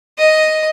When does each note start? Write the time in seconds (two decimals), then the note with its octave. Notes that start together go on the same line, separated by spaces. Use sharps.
0.18 D#5